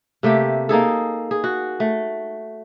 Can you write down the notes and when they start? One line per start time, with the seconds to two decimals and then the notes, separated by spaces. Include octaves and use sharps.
0.23 C3 A3 A#3 G4
0.69 A#3 D#4 G#4 A4
1.31 G#4
1.44 F#4
1.80 A3